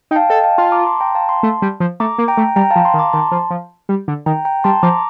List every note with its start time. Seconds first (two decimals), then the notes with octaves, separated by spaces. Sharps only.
0.11 D#4 G5
0.16 F5 A5
0.29 A4 D#5 G5
0.44 F5 A5
0.58 F4 A5 C6
0.72 A#5 D6
0.86 A5 C6
1.00 G5 A#5
1.15 F5 A5
1.29 A5 C6
1.43 A3
1.62 G3
1.80 F3
2.00 A3 A#5 D6
2.18 A#3
2.28 G5 A#5
2.37 A3
2.56 G3 G5 A#5
2.71 F5 A5
2.76 F3
2.84 A5 C6
2.94 D#3
2.99 A#5 D6
3.13 D#3 A5 C6
3.31 F3
3.50 F3
3.89 G3
4.08 D3
4.26 D#3 G5 A#5
4.45 G5 A#5
4.64 G3 A5 C6
4.83 F3 A#5 D6